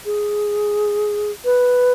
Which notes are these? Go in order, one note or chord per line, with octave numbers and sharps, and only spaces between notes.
G#4
B4